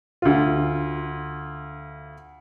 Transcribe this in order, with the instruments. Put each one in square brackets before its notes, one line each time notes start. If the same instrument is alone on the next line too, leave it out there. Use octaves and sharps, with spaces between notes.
[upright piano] D2 F4